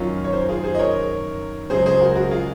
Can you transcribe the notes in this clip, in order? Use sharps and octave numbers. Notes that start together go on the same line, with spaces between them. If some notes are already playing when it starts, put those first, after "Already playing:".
Already playing: F#2 D#3 F#3 C#4 F4
C#5
C5
A#4
F4 G#4
G#4 C5
D#5
A#4 C#5
C#2 C#3 F#3 G#4 C5
G#4 C5
F#4 A#4
F#4 A#4
F4 G#4